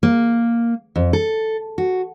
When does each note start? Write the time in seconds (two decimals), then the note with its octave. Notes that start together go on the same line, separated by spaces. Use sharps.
0.03 A#3
0.96 F2
1.13 A4
1.78 F#4